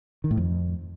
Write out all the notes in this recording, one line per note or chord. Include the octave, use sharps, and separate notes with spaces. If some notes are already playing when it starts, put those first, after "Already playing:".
D#3
A2
F2